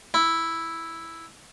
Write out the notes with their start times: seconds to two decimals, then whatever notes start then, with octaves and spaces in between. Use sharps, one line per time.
0.14 E4